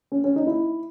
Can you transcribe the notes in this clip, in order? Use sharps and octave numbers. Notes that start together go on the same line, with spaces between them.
C#4
C#4
D#4
E4